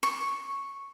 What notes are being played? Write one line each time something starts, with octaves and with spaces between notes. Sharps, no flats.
C#6